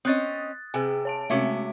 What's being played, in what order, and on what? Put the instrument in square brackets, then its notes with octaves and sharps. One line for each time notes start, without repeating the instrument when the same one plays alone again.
[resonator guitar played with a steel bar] C4 C#4 D#5 [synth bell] D#6 F#6 A6
[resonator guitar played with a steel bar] C3 G5 [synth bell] G#4 G#5
[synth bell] C#5 A5 D7
[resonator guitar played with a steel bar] C3 C#4 E5 [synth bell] G#3 A3 F#4